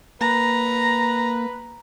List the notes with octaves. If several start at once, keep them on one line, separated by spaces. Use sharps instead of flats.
A#3 B4 A#5